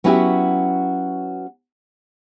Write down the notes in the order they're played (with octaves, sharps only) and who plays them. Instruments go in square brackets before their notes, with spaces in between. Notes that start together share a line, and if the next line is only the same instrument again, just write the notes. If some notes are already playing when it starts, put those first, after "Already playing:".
[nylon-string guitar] F#3 B3 C#4 E4 F#4 G4